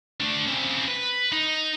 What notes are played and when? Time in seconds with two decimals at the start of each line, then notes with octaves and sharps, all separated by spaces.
0.20 A3 D4
0.47 C#3 C4
0.88 B4
1.32 D#4